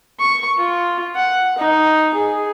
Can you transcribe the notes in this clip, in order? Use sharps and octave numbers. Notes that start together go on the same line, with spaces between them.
C#6
F4
F#5
D#4
G#4